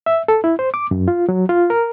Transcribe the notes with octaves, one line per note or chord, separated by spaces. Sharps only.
E5
A4
E4
C5
D6
F#2
F4
F#3
F4
A#4